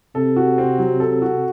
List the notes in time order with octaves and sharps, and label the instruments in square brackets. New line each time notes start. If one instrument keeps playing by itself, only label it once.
[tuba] C3 [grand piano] A4
[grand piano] F#4
C4
F#3
A4
F#4